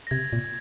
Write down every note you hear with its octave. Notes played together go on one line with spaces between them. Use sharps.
A#6
C3 G#6
A#2